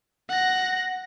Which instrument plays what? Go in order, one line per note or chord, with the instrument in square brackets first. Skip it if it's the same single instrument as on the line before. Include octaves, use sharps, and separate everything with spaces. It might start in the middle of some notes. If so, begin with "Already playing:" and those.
[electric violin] F#5 A#6